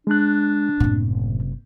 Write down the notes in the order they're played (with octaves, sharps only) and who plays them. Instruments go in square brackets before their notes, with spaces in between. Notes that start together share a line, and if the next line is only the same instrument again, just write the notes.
[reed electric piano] G#3 F#6 [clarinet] D4
[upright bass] F#1 C3 [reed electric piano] A2